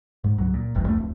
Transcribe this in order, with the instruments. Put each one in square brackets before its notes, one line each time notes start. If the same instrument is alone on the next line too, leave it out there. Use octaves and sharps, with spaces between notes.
[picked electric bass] G#2
C#2 F#3
A#2
E1 A1 E2 G2
C2 F2 A3
D1